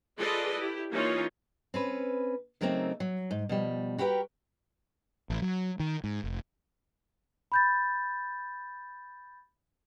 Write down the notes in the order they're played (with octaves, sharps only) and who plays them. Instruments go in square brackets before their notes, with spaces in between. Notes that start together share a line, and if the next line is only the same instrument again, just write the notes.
[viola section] F4 G#4 A4 B4 D5 D#5
E4 G4
E3 A#3 C#4 D#4 F4 C#5
[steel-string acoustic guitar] C4 C#4 B4
C#3 F#3 A3 A#3 C4 D#4
F#3
G#2
B2 F3 G3
F#4 G4 A#4 B4 E5 G5
[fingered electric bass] A1
F#3
D#3
G#2
F1
[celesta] B5 G6 A6